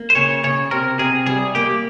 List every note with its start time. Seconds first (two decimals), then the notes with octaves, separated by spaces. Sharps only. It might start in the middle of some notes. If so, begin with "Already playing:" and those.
Already playing: A#3
0.10 C5
0.15 C#3 C#5
0.44 C#3 C#5
0.71 C3 A#4
0.99 C3 G#4
1.26 G3 G#4
1.55 A#3 G4